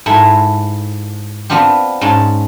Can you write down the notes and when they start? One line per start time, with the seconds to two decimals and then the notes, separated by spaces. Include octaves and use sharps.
0.06 G#2 E4 A4
1.50 B3 C4 D4 F4 G4
2.01 G#2 G#3 C#4 A5